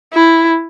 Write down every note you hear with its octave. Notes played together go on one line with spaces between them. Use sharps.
E4